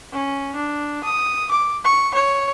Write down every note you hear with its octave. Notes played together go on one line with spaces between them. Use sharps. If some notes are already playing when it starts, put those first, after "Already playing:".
C#4
D4
D#6
D6
C#6
C#5